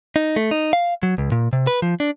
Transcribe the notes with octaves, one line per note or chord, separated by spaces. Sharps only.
D#4
A3
D#4
F5
F#3
C#2
A#2
C3
B4
F3
D4